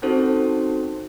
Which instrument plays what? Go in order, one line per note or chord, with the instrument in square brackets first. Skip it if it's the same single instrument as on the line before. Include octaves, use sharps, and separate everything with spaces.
[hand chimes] C4 C#4 D#4 F#4 A4 C5